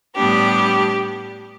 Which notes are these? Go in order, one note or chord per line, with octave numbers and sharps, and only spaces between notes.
A2 G3 B3 D4 G4